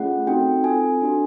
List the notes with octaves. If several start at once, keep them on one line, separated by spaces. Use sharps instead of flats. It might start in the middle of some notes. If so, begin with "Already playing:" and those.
Already playing: A3 C#4 F4 G#4 F#5
C4 D#4 F#4 A4 G5
C4 F4 A4 G#5
D4 F#4 A4